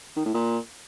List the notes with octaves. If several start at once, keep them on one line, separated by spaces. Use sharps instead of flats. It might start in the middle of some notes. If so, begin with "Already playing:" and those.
D#3
A2
A#2